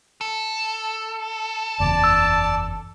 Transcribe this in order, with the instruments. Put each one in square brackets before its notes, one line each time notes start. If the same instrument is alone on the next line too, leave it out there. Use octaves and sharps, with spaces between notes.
[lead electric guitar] A4
[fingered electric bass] F#1 E2 C#3 [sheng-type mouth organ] D5 A5
[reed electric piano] E6